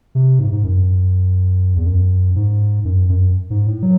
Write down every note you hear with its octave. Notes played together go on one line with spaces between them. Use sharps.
C3
G#2
G#2
F#2
E2
F#2
G#2
F#2
F#2
G#2
A2
F#3